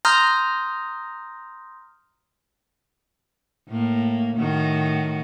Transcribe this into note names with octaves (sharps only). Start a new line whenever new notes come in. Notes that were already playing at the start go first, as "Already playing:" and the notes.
A#5 C6 D#6 F6 G6 A#6
A2 A#3
A2 D#3 F#4